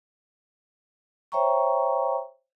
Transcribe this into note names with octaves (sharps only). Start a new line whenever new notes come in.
C5 C#5 E5 G5 A#5 C#6